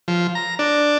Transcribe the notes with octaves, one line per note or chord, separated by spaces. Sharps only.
F3
A#5
D4